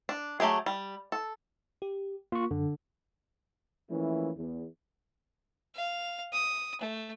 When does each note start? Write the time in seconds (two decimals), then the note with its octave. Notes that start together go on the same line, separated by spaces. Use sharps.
0.09 D4
0.40 F#3 A3 G4 G#4
0.66 G3
1.12 A4
1.82 G4
2.32 A#3 F4 C#6
2.51 F#2 D3
3.89 E3 F3 A3 A#3 C#4 E4
4.37 E2
5.76 F5
6.33 D#6
6.81 A3